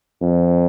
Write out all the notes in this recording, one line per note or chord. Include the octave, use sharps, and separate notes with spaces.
F2